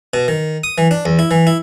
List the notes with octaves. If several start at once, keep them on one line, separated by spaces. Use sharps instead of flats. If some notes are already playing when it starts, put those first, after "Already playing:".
B2
D#3
D#6
E3
D4
E2
E4
E3
E4